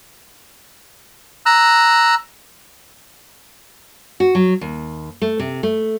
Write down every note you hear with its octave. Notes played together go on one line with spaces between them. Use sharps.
A#5 E6 F#6
F#4
F#3
D#2
A3
C3
A3